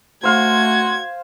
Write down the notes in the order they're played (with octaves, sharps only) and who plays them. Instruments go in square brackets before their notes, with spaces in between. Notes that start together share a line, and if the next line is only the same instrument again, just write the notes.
[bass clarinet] A3 [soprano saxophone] F#4 [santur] C5 F5 C6 [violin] G#6